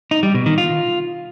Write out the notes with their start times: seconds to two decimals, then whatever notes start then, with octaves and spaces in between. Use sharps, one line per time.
0.11 D#4
0.23 G3
0.35 B2
0.46 D#3
0.58 F4